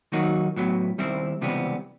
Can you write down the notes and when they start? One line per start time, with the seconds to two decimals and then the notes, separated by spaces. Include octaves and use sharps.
0.12 D#3 F#3 A#3 D#4 F#4
0.56 A2 F#3 B3
0.98 D#2 D#3 G3 C4 E4
1.41 C#2 C3 E3 G3 B3